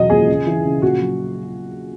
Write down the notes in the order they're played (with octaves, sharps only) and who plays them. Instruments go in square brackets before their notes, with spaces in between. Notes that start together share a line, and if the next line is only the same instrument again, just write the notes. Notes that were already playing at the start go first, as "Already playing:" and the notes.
Already playing: [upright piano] E1 C#2 F#3 D#5
D#2 G#4
C#3
E3
C#3
A#1 F#4
F#3